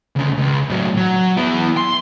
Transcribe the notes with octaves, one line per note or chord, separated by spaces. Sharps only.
D2 C#3
C#2
A2 F#3
F#3
B3 E4
C6